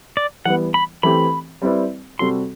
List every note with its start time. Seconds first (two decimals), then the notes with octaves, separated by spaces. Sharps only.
0.17 D5
0.45 E3 G3 B3 F#5
0.74 B5
1.03 E3 A3 C4 G4 B5
1.62 G3 C4 E4 B4 D5
2.19 C3 G3 C4 F#4 A4 C6